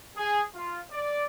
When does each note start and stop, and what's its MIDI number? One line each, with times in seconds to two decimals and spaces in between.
0.16 0.42 68
0.54 0.79 65
0.91 1.24 74